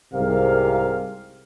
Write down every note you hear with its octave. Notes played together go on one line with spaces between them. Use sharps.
C2 G#2 C3 G#4 A#4 F5